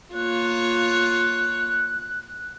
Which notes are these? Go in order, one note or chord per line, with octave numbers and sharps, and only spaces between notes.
A#3 F4 C#5 F#6